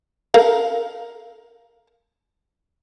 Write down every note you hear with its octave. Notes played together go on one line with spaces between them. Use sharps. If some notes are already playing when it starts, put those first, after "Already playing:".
A4 A#4 F5